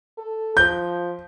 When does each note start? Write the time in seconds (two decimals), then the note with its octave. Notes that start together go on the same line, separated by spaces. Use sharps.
0.18 A4
0.57 F3 G6